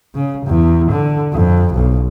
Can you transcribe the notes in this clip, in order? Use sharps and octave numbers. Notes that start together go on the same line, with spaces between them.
C#3
E2
D3
F2
B1